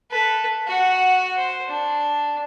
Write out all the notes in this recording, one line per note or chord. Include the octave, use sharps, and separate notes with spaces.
A4 B4
F#4 F#5
C5
D4